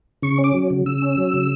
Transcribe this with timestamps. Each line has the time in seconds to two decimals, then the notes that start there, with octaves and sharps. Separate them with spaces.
0.22 C#3 C#6
0.38 C#4
0.44 D6
0.54 F#3
0.70 C#3
0.86 C#3 E6
1.02 C#4
1.17 F#3
1.34 C#3